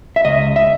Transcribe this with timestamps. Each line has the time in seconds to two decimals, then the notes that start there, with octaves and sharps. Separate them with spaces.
0.16 E5
0.25 C#2 D#5
0.56 E5